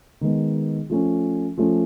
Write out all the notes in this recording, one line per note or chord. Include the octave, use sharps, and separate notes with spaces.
D#3 G#3 B3
F3 A3 C#4
F3 A3 C#4